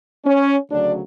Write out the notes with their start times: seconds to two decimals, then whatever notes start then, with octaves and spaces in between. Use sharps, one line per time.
0.25 C#4
0.70 D2 C#3 F#3 D4